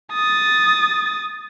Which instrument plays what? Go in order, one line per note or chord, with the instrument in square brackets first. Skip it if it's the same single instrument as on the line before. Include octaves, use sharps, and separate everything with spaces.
[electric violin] D#6 A6